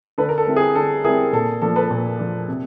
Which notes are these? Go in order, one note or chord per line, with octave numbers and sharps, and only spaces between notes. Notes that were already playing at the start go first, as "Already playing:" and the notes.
D3 A4 B4
A#4
A4
G3 C4 E4
G#4
D3 A4
G3 C4 E4 G#4 A#4
A#2 A4
F3 A#3 D4 A4
A4 B4
A#2
F3 A#3 D4
C3